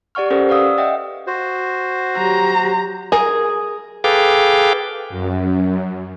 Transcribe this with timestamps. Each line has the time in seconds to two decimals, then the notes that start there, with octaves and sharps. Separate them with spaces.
0.15 G4 D5 F#5 C#6 F6
0.31 C#4 G4 A4 A#4 C5 F#5
0.49 B4 D5 F5 D#6 E6
0.78 D#5 E5 F#5 G5
1.27 F#4 C5
2.16 F#3 G4 A#5
3.12 G#4 A#4
4.04 G#4 A4 B4 F5 G5 D6
5.10 F#2